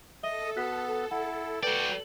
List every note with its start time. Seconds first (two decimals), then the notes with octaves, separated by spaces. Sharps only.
0.23 A4 D#5 E5 D#6 G7
0.56 B3 F#4 F#6 B6
1.11 E4 F#5
1.63 F#4 B4 D5 G5